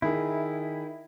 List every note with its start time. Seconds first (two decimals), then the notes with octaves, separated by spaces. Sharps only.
0.02 D#3 E4 G#4